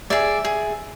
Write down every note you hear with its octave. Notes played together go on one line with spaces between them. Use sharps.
G#4 D5 E5
G#4